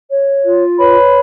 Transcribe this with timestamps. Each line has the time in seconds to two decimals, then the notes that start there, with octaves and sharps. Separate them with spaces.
0.11 C#5
0.44 F4
0.78 B4 C#5 B5